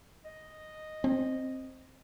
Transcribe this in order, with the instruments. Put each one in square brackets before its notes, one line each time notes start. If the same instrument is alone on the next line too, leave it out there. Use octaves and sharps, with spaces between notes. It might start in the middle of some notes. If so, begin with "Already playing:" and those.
[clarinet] D#5
[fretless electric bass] C4